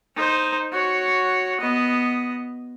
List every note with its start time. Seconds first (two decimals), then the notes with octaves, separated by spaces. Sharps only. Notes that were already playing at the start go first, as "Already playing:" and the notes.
0.16 D#4 C5
0.73 F#4 C#5
1.60 B3 D#5